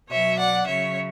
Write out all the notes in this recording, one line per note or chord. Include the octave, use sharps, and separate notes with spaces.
B2 F#3 C#5 E5
D5 F#5
C#3 F#3 C#5 E5